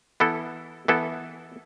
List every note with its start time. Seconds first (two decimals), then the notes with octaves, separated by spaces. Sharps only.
0.20 E3 B3 E4 A4
0.88 E3 B3 E4 A4